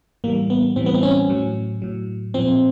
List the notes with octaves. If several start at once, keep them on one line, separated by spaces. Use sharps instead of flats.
A2 E3 G3 A#3
B3
A2 E3 G3 C4
B3
C4
C#4
A2 F#3
A2 F#3
A#2 F3 C4